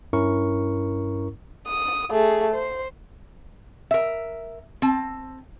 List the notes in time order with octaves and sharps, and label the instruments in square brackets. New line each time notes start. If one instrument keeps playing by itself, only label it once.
[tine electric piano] G2 C#4 E4 A#4 C#6
[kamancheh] D#6
A3 G#4
C5
[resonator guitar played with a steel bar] A#4 E5
C4 A5